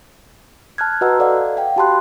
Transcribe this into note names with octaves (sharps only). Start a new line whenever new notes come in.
A5 F6 F#6 G#6
F#4 B4 D#5 F#5 A#5 E6
A4 D5 F5 F#5
F5 G5
F#4 G4 A5 B5 C6 F#6